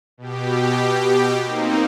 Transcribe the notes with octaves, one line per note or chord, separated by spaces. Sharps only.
B2 G4
A#3 C4 D#4